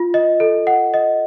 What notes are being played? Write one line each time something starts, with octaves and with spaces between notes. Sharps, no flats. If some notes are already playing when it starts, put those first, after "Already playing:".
Already playing: F4
D#5
A4
F#5
D#5